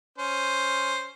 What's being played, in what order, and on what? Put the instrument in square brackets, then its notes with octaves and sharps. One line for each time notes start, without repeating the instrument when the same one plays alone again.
[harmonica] C#4 C5